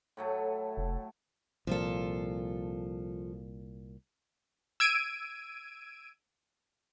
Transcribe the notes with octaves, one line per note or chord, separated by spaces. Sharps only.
A2 F#3 A3
F1
C2 A#2 F3 F4 A4
E6 G#6 D7 D#7